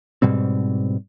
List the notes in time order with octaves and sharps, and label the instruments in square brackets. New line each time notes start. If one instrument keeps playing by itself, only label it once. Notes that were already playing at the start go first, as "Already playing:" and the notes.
[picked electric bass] G#2 B2 G3 C4